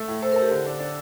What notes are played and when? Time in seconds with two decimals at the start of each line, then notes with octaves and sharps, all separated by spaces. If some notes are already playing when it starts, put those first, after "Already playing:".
Already playing: A3 A4
0.08 A2
0.22 A4 C5
0.32 A#4
0.36 A4
0.42 G4
0.51 D3
0.66 D4
0.80 D4